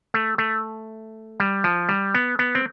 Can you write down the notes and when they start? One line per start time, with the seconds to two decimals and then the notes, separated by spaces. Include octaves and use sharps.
0.14 A3
0.38 A3
1.40 G3
1.64 F3
1.89 G3
2.14 B3
2.39 B3
2.55 C4